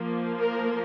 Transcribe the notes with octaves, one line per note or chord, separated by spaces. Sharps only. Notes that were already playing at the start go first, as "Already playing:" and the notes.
Already playing: F3 A#3
A#4